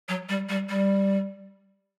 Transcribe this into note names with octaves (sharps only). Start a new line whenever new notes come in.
F#3
G3
G3
G3